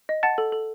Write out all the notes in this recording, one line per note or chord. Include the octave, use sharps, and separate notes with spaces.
D#5
F#5 A5 A6
A4
A4